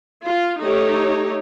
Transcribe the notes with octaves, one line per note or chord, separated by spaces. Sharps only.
F4
A3 D#4 G4 C#5